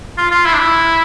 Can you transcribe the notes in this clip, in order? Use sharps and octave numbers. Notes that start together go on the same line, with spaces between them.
F4
F4
E4
D4
E4